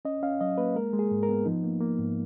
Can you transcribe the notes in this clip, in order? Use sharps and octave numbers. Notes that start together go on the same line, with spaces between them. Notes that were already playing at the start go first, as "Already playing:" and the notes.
C#4 D#5
C#4 F5
F#3 D#5
A#3 B4
G#3 A#4
G#3
G#4
G#2
A#4
B3
F3 D#4
A#3
A#3
G#2